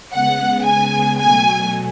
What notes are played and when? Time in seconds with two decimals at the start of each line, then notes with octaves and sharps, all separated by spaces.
0.13 C#3 G#3 B3 F#5
0.66 G#5
1.19 B2 F#3 A3 G#5